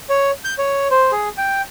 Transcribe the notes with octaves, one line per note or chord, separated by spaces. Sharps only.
C#5
G6
C#5
C5
G#4
G5